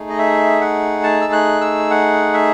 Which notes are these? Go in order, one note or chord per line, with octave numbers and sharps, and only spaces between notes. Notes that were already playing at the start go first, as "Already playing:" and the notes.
Already playing: A3 D#4 G#4
D#5
E5
F#5
A5
E6
F#6
E6
F#5
E5